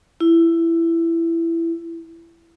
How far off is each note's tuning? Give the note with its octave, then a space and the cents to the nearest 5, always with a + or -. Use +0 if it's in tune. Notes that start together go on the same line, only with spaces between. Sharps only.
E4 +15